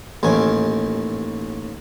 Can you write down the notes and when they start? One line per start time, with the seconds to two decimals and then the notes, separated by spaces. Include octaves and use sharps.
0.23 A1 D#2 D#3 G#5